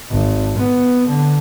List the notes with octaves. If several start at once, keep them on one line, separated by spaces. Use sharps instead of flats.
G#1
B3
D3